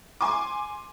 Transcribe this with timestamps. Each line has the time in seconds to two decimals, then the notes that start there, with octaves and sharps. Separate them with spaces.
0.21 G#5 C6 D6